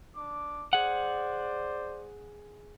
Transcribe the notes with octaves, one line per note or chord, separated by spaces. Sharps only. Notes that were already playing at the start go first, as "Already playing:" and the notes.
D4 D6
G#4 C5 D5 F#5